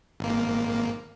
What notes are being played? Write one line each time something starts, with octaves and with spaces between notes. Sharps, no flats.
G#1 A#3